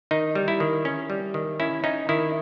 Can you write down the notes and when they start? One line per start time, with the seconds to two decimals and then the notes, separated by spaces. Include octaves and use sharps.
0.11 D#3 D#4
0.35 G3
0.48 E4
0.60 D#3
0.85 C#4
1.10 G3
1.34 D#3
1.60 C#4 E4
1.84 C#4 D#4
2.09 D#3 E4